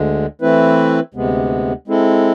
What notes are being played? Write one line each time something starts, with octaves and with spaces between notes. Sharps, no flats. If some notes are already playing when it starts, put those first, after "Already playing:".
Already playing: D2 D3 G#3
E3 A3 C4 E4 B4
D2 C3 G#3 B3
G#3 C4 E4 A4